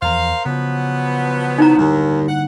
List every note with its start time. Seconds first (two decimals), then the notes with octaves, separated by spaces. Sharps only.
0.02 E2 F3 A#4 C5 F5
0.46 C#3 F3 F#3 B3
1.58 D#4 E4 A#5
1.78 D#2 D3 G3 A#3
2.29 F#5